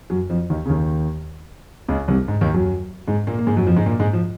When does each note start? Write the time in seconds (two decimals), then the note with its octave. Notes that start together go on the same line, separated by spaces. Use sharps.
0.10 F#2 F#3
0.29 F2 F3
0.50 D#2 D#3
0.65 C#3
0.69 D#2 D#3
1.88 C#2 C#3
2.08 C2 C3
2.28 G#2
2.41 D#2 D#3
2.54 F#2 F#3
3.08 G#2 G#3
3.27 A#2 A#3
3.39 A#3
3.47 G#2 G#3
3.56 F#2 F#3
3.66 F2 F3
3.76 G#2 G#3
3.86 A#2 A#3
4.00 G#2 G#3
4.13 F3